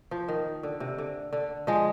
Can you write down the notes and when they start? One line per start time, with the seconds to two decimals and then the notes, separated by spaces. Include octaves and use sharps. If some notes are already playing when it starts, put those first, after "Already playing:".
0.11 F3
0.28 D#3
0.63 D3
0.80 C3
0.98 D3
1.33 D3
1.67 F3 G#3